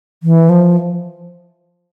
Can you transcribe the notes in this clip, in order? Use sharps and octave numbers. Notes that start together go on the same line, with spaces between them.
E3
F3